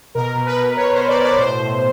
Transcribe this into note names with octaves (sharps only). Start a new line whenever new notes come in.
B2 A#4
B2
B4
B2
B2 C#5
B2 C5
D5
B2 D5
A2 C5
A2